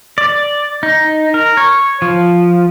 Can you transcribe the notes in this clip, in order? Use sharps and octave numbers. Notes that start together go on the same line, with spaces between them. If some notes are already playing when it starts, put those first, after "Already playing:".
D5
D#4
A#4
C#5
F3